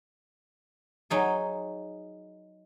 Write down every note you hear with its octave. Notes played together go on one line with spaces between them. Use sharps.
F#3 D#4 G#4